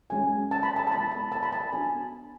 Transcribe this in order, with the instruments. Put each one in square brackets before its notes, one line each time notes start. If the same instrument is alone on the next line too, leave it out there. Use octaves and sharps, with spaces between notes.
[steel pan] G#3 C#4 F#4 G#5
A5
B5
A5
A5
G#3 B3 E4 B5
A5
A5
B5
A5
B3 D4 F#4 G#5